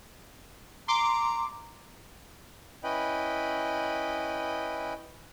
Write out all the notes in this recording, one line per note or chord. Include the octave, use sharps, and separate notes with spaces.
A#5 C6 D6
C#4 E4 B4 D#5 G5 B5